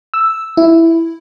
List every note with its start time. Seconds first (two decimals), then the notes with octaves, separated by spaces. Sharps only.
0.14 E6
0.57 E4